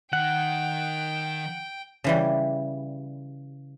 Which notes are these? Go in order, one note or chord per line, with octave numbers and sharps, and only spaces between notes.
D#3 F#5 G5
C#3 E3 G3